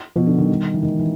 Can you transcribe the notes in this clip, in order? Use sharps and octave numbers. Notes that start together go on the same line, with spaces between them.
B2 F3
D3
D#3 F#3
G3
E3
D#3 G#3
E3